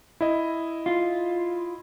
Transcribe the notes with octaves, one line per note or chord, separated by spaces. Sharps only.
E4 D#5
F4